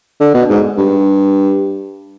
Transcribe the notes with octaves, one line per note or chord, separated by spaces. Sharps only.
D3
B2
G#2
G2